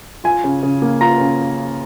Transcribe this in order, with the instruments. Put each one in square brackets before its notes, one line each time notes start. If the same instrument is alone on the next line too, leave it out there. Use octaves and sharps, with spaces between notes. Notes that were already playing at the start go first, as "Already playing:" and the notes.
[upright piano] F4 G#5
C#3
C#3
A#3
F4 A#5
C#3